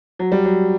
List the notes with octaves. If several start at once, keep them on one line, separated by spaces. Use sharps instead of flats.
F#3
G3
F#3